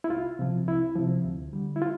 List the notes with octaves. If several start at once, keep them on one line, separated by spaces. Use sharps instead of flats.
E4
C2 F4
C3 F3
C2 E4
C3 F3
D2
D3 G3
E4
F4